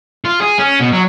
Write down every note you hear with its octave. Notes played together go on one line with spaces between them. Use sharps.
F4
G#4
C#4
B2
F#3